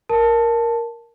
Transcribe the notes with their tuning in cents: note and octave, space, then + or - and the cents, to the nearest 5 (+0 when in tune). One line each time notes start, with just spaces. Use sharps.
A#4 +0 A5 +0